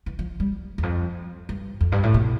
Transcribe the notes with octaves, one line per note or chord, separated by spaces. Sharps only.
E3
F3
G3
E2
F2
G2
F2
G2
A2
B2